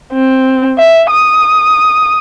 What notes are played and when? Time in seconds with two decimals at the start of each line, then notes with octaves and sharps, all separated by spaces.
0.13 C4
0.78 E5
1.10 D#6